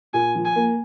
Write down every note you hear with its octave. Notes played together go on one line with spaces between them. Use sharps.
A#2 G#5
F3
G#5
A#3